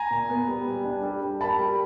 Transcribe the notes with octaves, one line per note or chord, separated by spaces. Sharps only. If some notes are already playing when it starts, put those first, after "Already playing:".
Already playing: G#5 A#5
A#2
B3
G3
G3
D4
G3
G3
A#3 A5 B5
G3